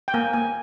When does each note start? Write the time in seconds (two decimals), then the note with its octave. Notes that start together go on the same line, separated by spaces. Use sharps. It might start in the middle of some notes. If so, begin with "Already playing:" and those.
0.08 G5
0.14 A#3 G#5
0.33 A#3 G#5